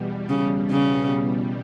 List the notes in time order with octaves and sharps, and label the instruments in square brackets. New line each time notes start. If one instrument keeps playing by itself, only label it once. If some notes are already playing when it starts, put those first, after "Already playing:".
Already playing: [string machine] E2 B2 G3
[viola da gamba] C#3
C#3